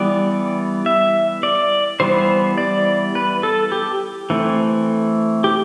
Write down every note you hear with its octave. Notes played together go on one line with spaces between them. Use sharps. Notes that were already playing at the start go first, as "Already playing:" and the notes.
Already playing: E3 G3 B3 D5
E5
D5
E3 G3 B3 C5
D5
B4
A4
G4
E3 A3 C4
G4